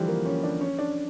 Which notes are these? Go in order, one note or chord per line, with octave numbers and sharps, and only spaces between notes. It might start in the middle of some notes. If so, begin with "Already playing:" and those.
Already playing: D3 E3 F3 G3
A#3
C#4
D4
C#4
D4